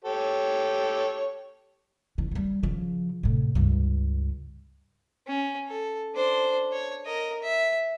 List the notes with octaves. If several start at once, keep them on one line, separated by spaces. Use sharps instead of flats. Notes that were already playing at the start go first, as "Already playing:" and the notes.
G4 A4 C#5
C#3 E3
F3 G3
C#3 F3
A2 C3
C#2 G2
C#4
A4
D4 C5
C#5
A#4 D#5
E5